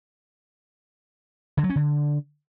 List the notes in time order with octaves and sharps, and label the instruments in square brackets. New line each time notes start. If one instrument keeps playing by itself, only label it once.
[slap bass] D3
F#3
C#4
D3